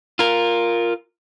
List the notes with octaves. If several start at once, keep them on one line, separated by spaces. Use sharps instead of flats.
F4 A#4